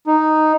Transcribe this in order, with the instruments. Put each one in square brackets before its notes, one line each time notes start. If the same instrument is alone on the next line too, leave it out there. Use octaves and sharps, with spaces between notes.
[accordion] D#4